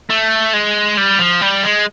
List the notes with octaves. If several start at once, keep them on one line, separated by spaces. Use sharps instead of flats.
A3
G#3
G3
F3
G3
G#3